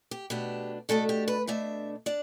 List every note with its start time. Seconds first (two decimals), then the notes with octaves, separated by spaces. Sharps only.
0.11 G4
0.30 B2 A3 D4 G4
0.89 B2 A3 D4 A4
1.09 G4
1.28 B4
1.47 B2 A3 D4 E5
2.06 D4 D5